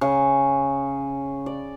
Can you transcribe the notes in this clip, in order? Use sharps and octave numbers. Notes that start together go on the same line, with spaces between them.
C#3
D5